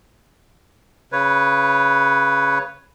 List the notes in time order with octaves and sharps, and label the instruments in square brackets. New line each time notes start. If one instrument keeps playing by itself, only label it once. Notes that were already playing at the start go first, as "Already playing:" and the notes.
[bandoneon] C#3 B4 C#5